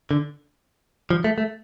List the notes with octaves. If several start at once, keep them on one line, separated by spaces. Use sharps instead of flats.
D3
F3
A3
A3